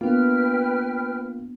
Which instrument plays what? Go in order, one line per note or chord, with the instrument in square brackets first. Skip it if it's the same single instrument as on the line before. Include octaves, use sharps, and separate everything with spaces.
[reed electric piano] A#3 F4 [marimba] B3 D4 [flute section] B4 G5 F6